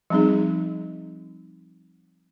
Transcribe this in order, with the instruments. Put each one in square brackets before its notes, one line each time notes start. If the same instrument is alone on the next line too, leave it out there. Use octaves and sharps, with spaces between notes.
[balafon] F3 G3 C4 D#4 G#4